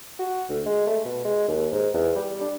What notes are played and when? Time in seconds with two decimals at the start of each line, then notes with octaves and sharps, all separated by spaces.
0.19 F#4
0.49 D2
0.66 G#3
0.87 A3
1.05 B2
1.25 G#3
1.48 D#2
1.72 G#2
1.93 E2
2.15 G3
2.41 D4